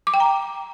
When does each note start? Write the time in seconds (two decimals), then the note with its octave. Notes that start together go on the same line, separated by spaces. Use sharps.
0.07 D6
0.14 G5
0.20 A#5